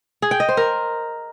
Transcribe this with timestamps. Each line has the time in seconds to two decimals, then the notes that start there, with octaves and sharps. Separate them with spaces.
0.22 G#4
0.31 G5
0.40 D#5
0.49 C5
0.57 A#4